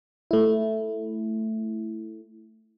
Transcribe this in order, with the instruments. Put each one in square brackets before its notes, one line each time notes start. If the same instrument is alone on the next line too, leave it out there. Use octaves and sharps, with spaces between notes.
[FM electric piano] A3 E4